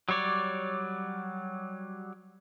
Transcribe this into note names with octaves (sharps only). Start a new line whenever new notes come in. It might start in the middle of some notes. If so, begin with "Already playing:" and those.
F#3 G3 C#5 D5